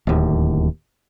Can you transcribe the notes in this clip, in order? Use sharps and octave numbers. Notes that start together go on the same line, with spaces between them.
D1 D#2